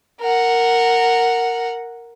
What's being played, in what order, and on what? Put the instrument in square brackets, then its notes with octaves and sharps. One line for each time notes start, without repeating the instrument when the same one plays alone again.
[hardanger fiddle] A#4 F#5